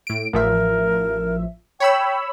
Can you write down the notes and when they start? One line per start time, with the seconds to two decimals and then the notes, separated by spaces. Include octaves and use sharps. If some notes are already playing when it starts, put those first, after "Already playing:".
0.07 A2 D7
0.33 A1 F3 A#4 E5
1.80 C#5 G5 B5 E6